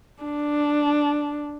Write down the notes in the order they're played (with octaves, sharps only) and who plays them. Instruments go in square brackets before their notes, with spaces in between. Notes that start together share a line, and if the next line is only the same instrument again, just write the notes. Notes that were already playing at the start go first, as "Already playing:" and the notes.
[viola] D4